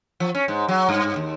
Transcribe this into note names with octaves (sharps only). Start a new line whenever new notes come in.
F3
C#4
G#2
F#3
G2
D#2